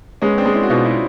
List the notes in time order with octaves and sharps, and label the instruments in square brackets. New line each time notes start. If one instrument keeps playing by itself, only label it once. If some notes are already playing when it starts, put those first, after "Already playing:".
[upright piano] G#3 [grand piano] B3 C#4
[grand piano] C4 D4
[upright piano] G#3
[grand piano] D4 E4
F#4
[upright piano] B2 [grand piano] D#4 F4
[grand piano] E4 F#4